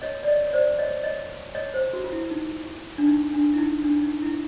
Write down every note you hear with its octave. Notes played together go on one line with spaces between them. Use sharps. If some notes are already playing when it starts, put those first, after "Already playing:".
C#5 D#5
D5
C#5 D#5
C#5
C5 D5
C#5 D#5
C#5 D#5
C#5 D#5
C5
F#4
F4
E4
D#4
D4
D#4
D4
E4
D#4
D4
D#4
E4